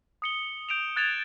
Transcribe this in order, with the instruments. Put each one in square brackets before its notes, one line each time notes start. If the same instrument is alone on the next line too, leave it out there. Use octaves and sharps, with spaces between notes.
[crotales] D#6 C#7 G7
G6 D7 E7 F7
F#6 G#6 A6 C#7 E7 F7